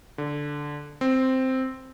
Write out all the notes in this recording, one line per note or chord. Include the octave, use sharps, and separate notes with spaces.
D3
C4